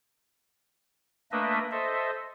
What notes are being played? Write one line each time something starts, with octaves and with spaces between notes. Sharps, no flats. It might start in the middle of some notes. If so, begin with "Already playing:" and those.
A3 A#3 D4 B4 D#5 E5
A4 C5 D#5 E5